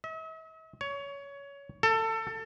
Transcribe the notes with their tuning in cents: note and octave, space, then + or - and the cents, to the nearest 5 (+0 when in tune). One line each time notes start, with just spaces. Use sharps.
E5 -45
C#5 +20
A4 +25